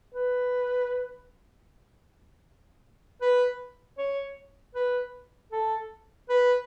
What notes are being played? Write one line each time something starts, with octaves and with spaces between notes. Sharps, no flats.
B4
B4
C#5
B4
A4
B4